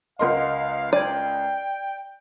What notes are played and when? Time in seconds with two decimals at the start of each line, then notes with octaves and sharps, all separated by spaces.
0.19 C#2 A#4 D#5 F5 F#5 C6
0.93 D5 G5 G#6 D#7